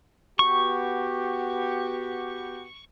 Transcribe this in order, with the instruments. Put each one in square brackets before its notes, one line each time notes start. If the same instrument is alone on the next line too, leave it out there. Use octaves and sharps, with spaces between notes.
[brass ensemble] B3 F#4 G4 [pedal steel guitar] C#6